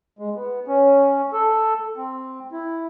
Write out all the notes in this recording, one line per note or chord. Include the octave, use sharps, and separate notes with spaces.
G#3
B3
C#4
A4
C4
E4